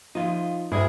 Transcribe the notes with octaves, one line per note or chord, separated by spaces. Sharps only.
F3 D#4 F4
D2 G2 G#3 E4 G#4